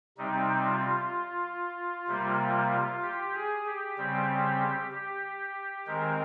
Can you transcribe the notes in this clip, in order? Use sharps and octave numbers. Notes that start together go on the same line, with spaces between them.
C3 G3 C4 D#4
F4
C3 G3 A#3
G4
G#4
G4
C#3 G3 C4
G4
D#3 G#3 C4 A#4